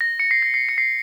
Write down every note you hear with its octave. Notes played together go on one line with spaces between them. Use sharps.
A#6
C#7
C7
A#6
C7
C#7
C7